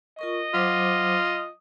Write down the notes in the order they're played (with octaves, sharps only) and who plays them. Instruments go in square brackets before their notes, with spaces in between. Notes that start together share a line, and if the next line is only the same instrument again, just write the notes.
[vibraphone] F4 A#4 C#6 [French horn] D#5
[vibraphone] F#3 C5 D6 [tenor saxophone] F4
[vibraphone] D#6